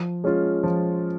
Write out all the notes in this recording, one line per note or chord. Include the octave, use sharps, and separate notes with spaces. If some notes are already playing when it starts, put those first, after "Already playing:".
Already playing: F3
G#3 C#4 F4
F3